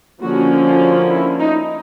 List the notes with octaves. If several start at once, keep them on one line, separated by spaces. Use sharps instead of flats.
D3 F3 A#3 C#4 F#4
F4
E4
D#4